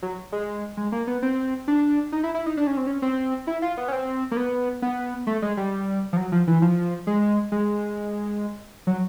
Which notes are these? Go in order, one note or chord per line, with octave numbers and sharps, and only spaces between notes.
F#3
G#3
G#3
A#3
B3
C4
D4
D#4
E4
E4
D#4
D4
C#4
C4
C#4
C4
E4
F4
B3
C#4
C4
A#3
B3
B3
A3
G#3
G3
F3
F#3
F3
E3
F3
G#3
G#3
F#3